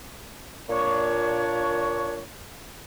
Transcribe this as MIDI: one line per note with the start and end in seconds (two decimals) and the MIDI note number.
0.70 2.21 46
0.70 2.21 62
0.70 2.21 73